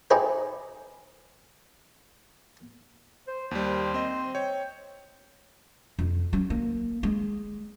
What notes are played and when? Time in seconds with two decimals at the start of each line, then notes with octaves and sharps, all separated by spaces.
0.11 D#4 G4 G#4 B4 C5 E5
3.27 C5
3.51 D#2 G3 C5
3.94 C4 D#5
4.35 C#5 G5
5.99 F2
6.33 F#3 C#4
6.50 A#3
7.03 G#3